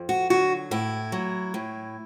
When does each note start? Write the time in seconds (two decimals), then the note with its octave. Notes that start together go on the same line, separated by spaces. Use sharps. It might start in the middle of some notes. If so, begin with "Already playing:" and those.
Already playing: F2
0.09 F#4
0.30 D3 F#3 F#4
0.71 A2 E4
1.12 F#3
1.54 A2